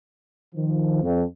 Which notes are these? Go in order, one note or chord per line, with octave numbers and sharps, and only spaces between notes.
D#3 F3
F2